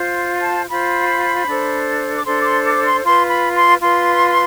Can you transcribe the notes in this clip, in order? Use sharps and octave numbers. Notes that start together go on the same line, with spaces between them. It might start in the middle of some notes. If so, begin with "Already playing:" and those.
Already playing: F4 C5
A5
F4 C5 B5
D4 A4 C5
D6
D4 A4 C5 C6
D6
C6
D6
C6
F4 B4 C6
B5
C6
F4 B4 C6